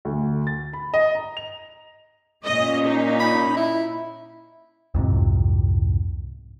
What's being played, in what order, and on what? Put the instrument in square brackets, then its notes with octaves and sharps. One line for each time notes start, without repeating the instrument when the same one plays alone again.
[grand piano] D2
A6
B5
D#5
A#5
F7
[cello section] A#2 C#4 [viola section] D#5
[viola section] D#4
[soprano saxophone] B5
E4
[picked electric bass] C2 F2 G#2 C3